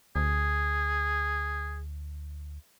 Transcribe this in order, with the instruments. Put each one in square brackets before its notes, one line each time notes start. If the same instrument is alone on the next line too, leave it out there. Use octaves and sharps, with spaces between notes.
[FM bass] D2 [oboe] G#4